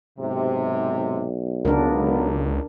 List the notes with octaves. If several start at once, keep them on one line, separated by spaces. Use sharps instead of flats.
B1 G#2 C3
C#2 G#3 A#3 B3 D4 A#4